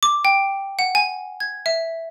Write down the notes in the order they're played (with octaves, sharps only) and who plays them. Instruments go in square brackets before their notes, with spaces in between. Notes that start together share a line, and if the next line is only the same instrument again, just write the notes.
[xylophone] D6
G5
F#5
G#5
G#6
E5